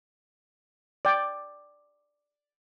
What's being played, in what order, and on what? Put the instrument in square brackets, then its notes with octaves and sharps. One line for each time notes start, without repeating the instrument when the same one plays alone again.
[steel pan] D5 G5